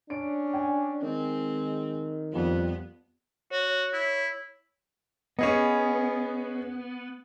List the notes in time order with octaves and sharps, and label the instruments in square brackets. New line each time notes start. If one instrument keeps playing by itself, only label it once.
[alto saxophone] C#4 [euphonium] D4 [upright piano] D7
[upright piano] G5 G#5
[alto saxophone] D#3 [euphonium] G#3 [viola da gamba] C4
[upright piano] F2 F3 [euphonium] G3 [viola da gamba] B3
[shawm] F#4 [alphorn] C#5
[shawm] E4
[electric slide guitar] B3 [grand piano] C#4 G#4 D#5